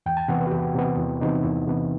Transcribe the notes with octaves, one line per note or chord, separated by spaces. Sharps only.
E2 G5
A5
C3 E3 B3 F#5
B4
F#4
E2 G4
C3 E3 B3
E2 E4
C3 E3 B3 D#4
E2 E4
C3 E3 B3